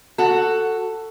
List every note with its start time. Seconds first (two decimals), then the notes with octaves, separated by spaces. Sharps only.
0.18 F#4 A4